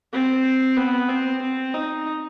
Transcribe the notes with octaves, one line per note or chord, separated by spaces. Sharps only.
C4
B3
C4
C4
D#4